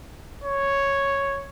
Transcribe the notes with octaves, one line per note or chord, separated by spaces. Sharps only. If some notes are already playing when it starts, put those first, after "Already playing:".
C#5